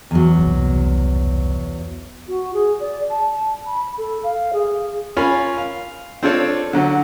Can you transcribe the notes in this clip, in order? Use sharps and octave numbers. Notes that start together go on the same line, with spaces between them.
E2 F#3
F#1 C2
F#4
G#4
D5
A5
B5
A4
F5
G#4
C#4 F4 A#4 F5 G#5 B5
F5
C4 D4 F4 A4 C#5
D3 F#3